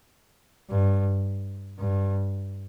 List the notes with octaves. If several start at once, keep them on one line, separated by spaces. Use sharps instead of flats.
G2
G2